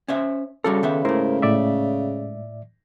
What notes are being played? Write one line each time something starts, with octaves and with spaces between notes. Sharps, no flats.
C#4 C5 E5
C#3 G3 F#4 A4 A#4
D#3 B3 E5
G#2 A3 E4 A#4 C5
A2 D5 E5